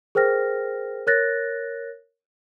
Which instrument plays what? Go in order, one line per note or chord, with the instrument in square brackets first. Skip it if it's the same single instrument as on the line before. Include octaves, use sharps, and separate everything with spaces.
[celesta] G#4 A#4 C5 G5 F6 A#6
A#4 C#5 F#6 A6 A#6